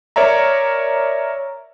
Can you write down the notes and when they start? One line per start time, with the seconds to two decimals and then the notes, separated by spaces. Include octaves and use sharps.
0.16 A#4 C#5 D5 E5 A#5